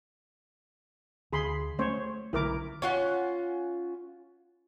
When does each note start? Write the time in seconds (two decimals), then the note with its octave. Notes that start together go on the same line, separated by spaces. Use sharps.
1.33 D2 G#4 B5 C6
1.79 A3 C#4 C5 C#5
2.33 B1 D3 E4 A#4 D6
2.82 C#4 F4 F#5